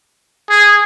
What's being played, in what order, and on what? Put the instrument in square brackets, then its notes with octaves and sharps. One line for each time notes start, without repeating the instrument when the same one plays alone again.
[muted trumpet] G#4